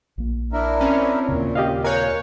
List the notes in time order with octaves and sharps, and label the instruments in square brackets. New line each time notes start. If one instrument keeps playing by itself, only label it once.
[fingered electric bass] A#1 A#3
[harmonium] D4 E4 A#4
[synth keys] C4 C#4
[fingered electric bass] D#2 C#3 [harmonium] A#2
[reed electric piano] G4 D#5 F5
[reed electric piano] A#4 F#6 G6 [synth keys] C#5 F5 G#5